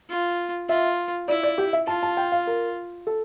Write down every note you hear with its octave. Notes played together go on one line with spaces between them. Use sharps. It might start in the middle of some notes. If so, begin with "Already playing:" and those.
F4
F4 E5
E4 D5
D5
G4
E5
F4 A5
A5
G5
F5
A#4
A4